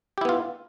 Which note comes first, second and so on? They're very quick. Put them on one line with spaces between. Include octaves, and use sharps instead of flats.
G4 E4 B3 F4